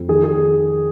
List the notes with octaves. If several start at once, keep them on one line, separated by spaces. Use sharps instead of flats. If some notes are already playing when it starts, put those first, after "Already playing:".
Already playing: F2
D#3 G#4
G#4